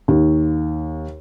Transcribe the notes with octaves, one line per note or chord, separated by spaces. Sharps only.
D#2